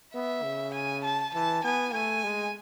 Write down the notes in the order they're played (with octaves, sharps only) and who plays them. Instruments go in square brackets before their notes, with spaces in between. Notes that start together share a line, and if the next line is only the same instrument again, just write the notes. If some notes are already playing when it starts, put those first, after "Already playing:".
[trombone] B3 [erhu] E5
[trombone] C#3
[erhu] G#5
A5
[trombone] E3 [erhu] A5
[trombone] B3 [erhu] G#5
[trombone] A3 [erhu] G#5
[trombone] G#3